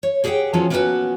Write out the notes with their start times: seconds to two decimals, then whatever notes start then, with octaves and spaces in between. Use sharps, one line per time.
0.03 C#5
0.24 G4 G#4 C5 E5 F#5 G5
0.53 F3 F#3 B3 C#4 F4
0.70 A#3 B3 C#4 D4 F#4 B4